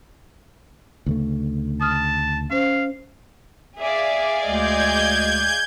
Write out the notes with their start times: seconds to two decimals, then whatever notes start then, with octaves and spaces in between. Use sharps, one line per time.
1.06 D2 C#3 A3
1.81 A5 D#6 F6
2.50 C#4 C5 F5
3.80 G#4 D5 E5 F5
4.46 D2 G#3 D#5 G6 G#6